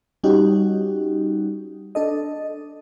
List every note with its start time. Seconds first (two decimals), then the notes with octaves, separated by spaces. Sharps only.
0.24 G3 C#4 D#4 F#4 G4
1.95 D4 A4 D#5